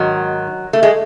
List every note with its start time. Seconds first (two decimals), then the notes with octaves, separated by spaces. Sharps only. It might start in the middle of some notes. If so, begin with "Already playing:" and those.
Already playing: G#2 D#3 F#3
0.73 A3
0.83 G#3